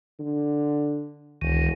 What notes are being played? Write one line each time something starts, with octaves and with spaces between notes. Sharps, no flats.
D3
E1 C#2 D#3